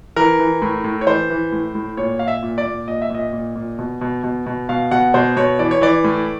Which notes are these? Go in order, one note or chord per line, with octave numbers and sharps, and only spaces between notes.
E3 A#4
E3
A2
A2
C#5
E3 C5
E3
A2
A2
A#2 C#5
A#2 F5
E5
A#2
D5
A#2
A#2 D#5
E5
A#2 D#5
A#2
A#2
B2
B2
B2
B2
B2 F5
B2 F#5
B2 C5
B2 C#5
E3 D5
C#5
E3 D5
A2